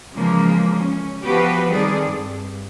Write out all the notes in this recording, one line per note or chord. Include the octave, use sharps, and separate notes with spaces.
C#3 E3 F3 G#3 A#3
C#4
F3 B3 F#4 G4 B4
D#3 G3 C4 G#4 A4 D5
G2